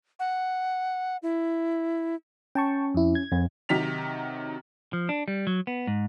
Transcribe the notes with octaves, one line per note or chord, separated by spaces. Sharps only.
F#5
E4
C#4 G5 A5 C#6
F2 E4
G#6
F2
C3 D#3 F#3 B6 F7
F3
D4
G3
F#3
B3
G#2